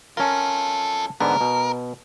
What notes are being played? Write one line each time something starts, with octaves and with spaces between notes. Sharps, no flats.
C#4 F4 A4 A#4
G#2 D3 B3 A#4
B2